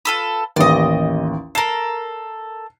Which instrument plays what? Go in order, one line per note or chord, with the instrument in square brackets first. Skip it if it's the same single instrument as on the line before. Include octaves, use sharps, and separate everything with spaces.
[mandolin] F4 A4 B4
[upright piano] A1 D#2 [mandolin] D5 D#5
[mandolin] A4 A#4 [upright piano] C7